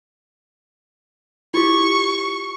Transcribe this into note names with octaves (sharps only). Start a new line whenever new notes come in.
E4 F4 G4 C#6